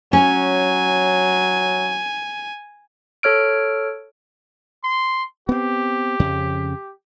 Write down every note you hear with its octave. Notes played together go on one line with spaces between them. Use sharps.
F#3 C#4 G#5
A4 C#5 F6 D7
C6
B3 C4 G4
F2 C#3